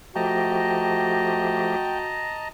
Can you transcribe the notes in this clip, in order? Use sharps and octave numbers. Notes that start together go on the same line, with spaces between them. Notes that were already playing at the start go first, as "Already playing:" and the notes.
F3 A3 F#4 G4 D#5 G5 A5 A#5